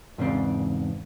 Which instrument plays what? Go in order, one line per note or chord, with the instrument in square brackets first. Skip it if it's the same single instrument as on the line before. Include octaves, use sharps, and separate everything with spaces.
[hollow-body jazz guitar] E2 G#2 C#3 C4 D4